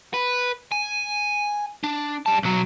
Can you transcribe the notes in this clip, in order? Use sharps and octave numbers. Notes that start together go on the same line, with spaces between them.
B4
G#5
D4
G3 A5
B1 F#3